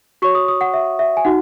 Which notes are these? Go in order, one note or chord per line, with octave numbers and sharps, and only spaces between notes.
F#4 C#5 C#6
D#6
D#6
F#5
E5
E5
G#5
D#4 F#4 F#5